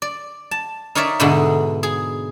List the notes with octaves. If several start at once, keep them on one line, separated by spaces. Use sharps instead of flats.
D5
A5
D#4 A#4 C#5 D5 E5
G#2 B2 D3 B3 D#4 E4
G#4